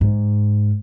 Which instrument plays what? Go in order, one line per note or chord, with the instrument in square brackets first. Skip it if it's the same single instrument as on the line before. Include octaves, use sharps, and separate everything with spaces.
[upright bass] G#2